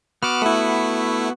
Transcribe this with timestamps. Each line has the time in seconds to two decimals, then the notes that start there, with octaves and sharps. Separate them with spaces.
0.23 B3 F#4 D6 F6
0.42 A3 E4